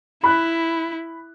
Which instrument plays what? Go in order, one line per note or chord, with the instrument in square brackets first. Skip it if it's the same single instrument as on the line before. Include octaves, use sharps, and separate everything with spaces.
[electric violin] E4 [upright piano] B5 F#6